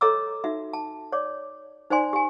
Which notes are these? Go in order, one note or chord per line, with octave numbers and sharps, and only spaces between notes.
A4 C#5 D#5 A#5 D6 E6
D#4 F#4 E5
A5
C#5 D5 D6
D#4 C5 D5 G#5 C6
G4 G#5